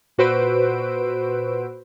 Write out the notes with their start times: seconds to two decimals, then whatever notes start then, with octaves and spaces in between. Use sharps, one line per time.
0.18 A#2 F#4 B4 C5 E6 D7